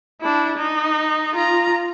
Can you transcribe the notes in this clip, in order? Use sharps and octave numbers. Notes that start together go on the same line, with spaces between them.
D4 E4
D#4
F4 A#5